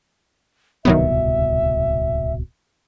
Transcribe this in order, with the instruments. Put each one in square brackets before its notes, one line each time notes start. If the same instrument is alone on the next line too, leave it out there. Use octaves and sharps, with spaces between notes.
[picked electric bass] D1 C2 B2 [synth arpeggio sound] D#3 F#3 B3 [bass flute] E5